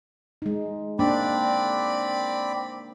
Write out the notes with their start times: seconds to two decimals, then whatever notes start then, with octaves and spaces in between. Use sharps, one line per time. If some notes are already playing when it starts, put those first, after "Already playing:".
0.42 G#3 D#4
0.99 A#3 C4 D4 D5 B5